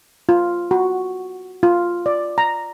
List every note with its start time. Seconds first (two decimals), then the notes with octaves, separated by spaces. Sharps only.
0.29 F4
0.71 F#4
1.63 F4
2.06 D5
2.38 A#5